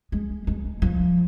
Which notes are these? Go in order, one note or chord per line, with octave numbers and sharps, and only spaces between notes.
G#3
G#3
F3